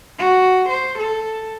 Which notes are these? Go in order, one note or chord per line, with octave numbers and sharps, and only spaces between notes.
F#4
C5
A4